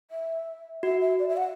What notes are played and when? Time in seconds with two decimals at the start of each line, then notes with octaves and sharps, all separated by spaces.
0.11 E5
0.83 F#4 E5
1.01 E5
1.19 D5
1.29 E5
1.37 F#5